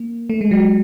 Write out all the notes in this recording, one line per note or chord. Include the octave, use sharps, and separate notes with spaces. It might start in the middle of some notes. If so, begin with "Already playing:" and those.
Already playing: A#3
A3
G#3
F#3